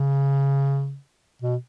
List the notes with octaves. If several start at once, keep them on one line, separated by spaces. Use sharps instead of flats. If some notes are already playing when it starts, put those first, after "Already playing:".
Already playing: C#3
B2